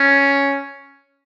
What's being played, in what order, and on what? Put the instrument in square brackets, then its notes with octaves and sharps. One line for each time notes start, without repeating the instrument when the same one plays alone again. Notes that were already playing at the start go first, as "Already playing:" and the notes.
Already playing: [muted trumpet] C#4